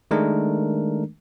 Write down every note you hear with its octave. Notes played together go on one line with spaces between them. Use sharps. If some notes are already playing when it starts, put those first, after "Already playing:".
D#3 G#3 A3 D4 A#4